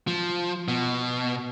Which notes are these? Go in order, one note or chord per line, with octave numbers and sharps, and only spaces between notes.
F3
B2